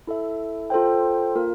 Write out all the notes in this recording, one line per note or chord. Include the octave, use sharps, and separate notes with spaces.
E4 A4 E5
F4 A4 C5 G5
A#3 F4 A#4